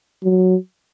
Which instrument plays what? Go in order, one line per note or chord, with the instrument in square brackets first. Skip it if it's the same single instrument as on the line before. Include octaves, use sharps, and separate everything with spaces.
[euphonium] F#3